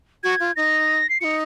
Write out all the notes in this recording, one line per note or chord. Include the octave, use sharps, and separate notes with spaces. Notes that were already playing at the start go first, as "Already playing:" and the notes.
F#4 G#6
F4
D#4 A#6
C7
D#4 F4 C#7